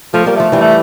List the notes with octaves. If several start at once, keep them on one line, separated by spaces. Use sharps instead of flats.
F3 A3
G3 A#3
F3 A3
E3 G3
A3